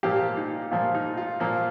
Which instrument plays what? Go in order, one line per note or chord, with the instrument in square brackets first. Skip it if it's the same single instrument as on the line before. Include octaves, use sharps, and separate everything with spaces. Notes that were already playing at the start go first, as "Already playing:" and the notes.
[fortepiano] A#2 F3 A#3 G4
D#4
A#2 F3 A#3 F4
D#4
F4
A#2 F3 A#3